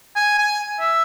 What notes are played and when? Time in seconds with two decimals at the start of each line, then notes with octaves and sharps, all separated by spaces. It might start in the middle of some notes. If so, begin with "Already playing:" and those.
0.16 G#5
0.38 G#5
0.80 E5